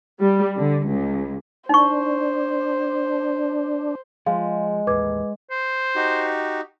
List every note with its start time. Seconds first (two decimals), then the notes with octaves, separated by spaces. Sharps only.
0.20 G3
0.57 D3
0.86 C#2
1.69 D4 D#4 C5 C#6
4.26 F3 G#3 G#4 F5
4.87 A1 D#2 B4 D6 G#6
5.51 C5
5.96 D#4 F#4 G4